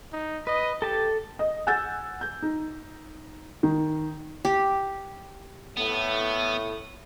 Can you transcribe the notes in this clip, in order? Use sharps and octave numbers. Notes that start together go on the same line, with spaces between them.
D#4
B4 D#5
G4 A4 A5
D#5
F#5 G#5 E6 G6 A6
G6
D#4
D#3
G4
A2 B3